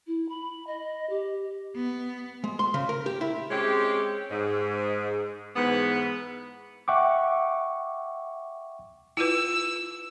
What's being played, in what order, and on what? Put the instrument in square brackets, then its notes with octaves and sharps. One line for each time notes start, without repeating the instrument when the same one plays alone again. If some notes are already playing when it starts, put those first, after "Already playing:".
[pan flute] E4
B5
D#5
G4
[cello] B3
[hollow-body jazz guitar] G#3
C6
C#3
A#4
G4
E4
[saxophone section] G#3 C4 C#4 G4
G#2
G#2 E3 B3
[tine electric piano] E5 F#5 G5 C#6 D6
[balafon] E4 F4 B4 [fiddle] E6